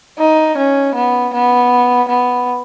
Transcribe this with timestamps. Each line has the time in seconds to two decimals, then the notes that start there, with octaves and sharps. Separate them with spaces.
0.19 D#4
0.57 C#4
0.95 B3
1.33 B3
2.08 B3